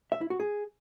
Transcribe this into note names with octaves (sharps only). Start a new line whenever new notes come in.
E5
E4
F#4
G#4